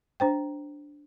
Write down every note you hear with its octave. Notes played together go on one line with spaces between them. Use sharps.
D4 C5 G5